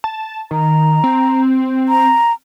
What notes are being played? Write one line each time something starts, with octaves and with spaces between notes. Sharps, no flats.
A5
D#3 A#5
C4
A#5